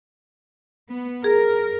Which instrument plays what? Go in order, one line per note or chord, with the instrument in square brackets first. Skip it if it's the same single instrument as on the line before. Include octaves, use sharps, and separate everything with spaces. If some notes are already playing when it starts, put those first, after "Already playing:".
[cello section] B3
[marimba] G#4 [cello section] A#4